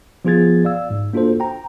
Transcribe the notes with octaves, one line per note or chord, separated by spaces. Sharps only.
F3 B3 F4 G#4 G#6 A6
D5 F5 E6
G#2
A#3 D4 F4 F#4 A4 C5
G5 A#5